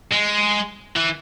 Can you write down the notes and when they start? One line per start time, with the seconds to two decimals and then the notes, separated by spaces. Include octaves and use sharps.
0.12 G#3
0.96 E3